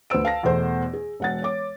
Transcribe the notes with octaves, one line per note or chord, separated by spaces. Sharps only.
D2 B4 C5 E6 D7
F5 A5 A#6
E2 B2 A3 C5
G#4
E1 F#5 A6
C#5 D6